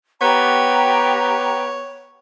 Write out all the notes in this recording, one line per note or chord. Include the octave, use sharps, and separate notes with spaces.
B3 G4 C#5 G5 A#5